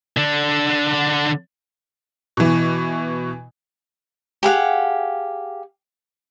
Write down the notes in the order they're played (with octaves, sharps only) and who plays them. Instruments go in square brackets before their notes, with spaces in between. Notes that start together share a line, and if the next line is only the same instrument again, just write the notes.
[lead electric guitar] D3 D4
[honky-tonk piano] B2 E3
[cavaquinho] G4 G#4 F5 F#5